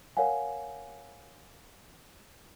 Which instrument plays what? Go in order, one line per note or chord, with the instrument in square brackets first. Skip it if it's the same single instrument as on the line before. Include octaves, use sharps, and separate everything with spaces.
[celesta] A#4 C#5 F5 F#5 G#5